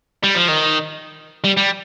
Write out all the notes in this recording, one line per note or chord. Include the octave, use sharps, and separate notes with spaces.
G3
F3
D#3
G3
G3